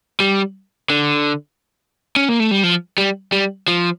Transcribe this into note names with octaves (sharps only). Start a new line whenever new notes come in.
G3
D3
C#4
A#3
A3
G3
F3
G3
G3
F3